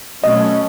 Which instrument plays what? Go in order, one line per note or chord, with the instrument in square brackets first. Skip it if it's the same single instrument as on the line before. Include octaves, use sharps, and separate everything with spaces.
[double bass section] B2 F#3 A3 C#4 [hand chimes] D#5